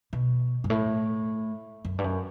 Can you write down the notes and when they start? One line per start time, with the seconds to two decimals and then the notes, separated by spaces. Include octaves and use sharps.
0.13 B2
0.64 G2
0.70 A2
1.85 F#2
1.98 G2
2.04 F#2